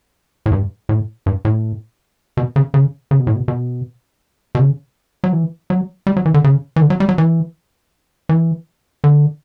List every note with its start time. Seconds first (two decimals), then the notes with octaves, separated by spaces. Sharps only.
0.46 A2
0.52 G2
0.89 A2
1.26 G2
1.45 A2
2.37 B2
2.56 C#3
2.74 C#3
3.11 C#3
3.19 B2
3.27 A2
3.35 B2
3.48 B2
4.55 B2
4.59 C#3
5.24 F#3
5.33 E3
5.70 F#3
6.07 G3
6.17 F#3
6.26 E3
6.34 D3
6.44 C#3
6.76 E3
6.81 D3
6.90 F#3
7.00 G3
7.09 F#3
7.18 E3
8.29 E3
9.04 D3